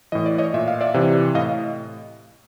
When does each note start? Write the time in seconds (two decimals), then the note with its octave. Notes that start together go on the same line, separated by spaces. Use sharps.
0.12 A2 E3 D#5
0.26 D5
0.38 C#5 D#5
0.54 A#2 E5
0.68 F5
0.81 D5 E5
0.94 C3 E3
1.35 A2 D#5 F5